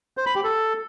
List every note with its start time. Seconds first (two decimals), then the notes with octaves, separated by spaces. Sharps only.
0.17 C5
0.26 B5
0.35 G4
0.44 A4